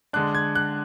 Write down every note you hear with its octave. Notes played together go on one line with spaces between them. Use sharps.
D3 G#3 D4 F#6
G#6
F#6